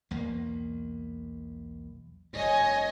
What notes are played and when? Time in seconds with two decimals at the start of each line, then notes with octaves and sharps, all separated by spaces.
0.11 B1 E2 A#3
2.33 F1 G2 C#5 D#5 G#5